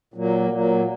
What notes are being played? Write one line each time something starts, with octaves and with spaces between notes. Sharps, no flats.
A#2 F#3 A#3
A#2 F#3 A#3